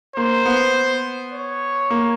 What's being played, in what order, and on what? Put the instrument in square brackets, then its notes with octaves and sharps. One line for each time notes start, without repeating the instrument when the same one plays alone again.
[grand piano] A#3 [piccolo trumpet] C5
[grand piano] B3
[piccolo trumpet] C#5
[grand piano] A#3